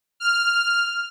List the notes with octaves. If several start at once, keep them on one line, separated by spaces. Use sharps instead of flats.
F6